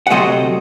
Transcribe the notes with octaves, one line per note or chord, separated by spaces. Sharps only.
F#5
D2 C3 F#3 A3 C5 D#5